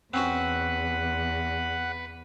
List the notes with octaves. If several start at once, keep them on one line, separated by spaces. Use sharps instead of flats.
E2 C4 C#4 F#4 B4 F#5